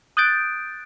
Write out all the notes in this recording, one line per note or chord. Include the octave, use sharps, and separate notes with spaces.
D#6 F#6 G6 A6 D7